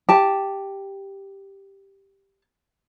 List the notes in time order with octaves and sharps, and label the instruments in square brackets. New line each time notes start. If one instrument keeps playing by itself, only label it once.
[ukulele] G4 A5